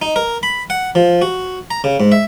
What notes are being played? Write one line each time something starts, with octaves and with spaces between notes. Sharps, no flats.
D#4
A#4
B5
F#5
F3
F#4
A#5
C#3
G#2
E5